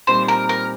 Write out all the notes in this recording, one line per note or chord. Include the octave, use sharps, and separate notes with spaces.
A#2 G3 C4 D#4 C5
A#4
A#4